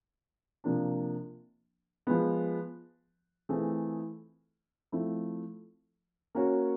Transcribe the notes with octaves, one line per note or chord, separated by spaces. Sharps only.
C3 F3 A#3 D4
F3 G#3 B3
E3 A3 C4 F4 G#4
F3 A3 C4 E4
A#3 C#4 F#4